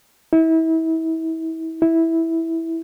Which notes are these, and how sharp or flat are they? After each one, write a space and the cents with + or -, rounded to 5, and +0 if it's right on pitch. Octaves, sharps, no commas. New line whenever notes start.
E4 -35
E4 -10